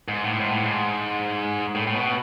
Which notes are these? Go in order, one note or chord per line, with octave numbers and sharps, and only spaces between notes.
G#2
A2
G#2
A2
G#2
A2
A2
B2